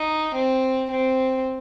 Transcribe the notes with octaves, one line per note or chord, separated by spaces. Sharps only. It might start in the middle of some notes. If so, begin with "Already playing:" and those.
Already playing: D#4
C4
C4